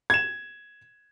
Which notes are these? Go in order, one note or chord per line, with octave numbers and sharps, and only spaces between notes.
G#6 E7